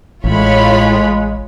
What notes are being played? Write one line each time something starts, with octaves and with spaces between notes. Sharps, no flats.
A1 A2 G#3 F4 C#5 B5